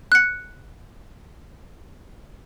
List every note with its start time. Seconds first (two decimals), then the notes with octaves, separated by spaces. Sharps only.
0.12 F#6 C#7